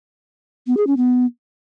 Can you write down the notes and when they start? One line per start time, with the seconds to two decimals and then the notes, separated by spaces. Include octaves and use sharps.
0.67 B3
0.77 G#4
0.87 C#4
0.97 B3